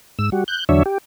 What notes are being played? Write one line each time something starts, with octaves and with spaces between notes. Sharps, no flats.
G#2 E6
G3 F#4
F#6 G6
E2 D3 F#3 D4 C#5 E5
G4